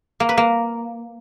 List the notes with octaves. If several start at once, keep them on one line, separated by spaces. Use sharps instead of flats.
A#3
B4
A#3